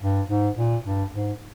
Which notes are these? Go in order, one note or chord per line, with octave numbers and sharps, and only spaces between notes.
G2
G#2
A#2
G2
G#2